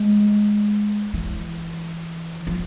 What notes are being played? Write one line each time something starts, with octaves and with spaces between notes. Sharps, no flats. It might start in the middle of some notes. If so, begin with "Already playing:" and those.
Already playing: G#3
E3
F3